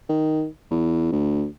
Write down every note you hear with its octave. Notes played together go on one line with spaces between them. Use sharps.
D#3
E2
D2